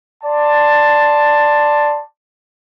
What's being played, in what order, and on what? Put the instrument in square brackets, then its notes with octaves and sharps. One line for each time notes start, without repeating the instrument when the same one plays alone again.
[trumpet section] D5 A5 C6